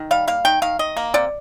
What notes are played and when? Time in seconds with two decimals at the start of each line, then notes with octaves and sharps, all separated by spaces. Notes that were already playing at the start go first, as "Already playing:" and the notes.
Already playing: D#3
0.11 G3 F5
0.28 A#3 F5
0.45 D#3 G5
0.62 D#3 F5
0.79 D#3 D#5
0.97 A#3
1.14 C3 D5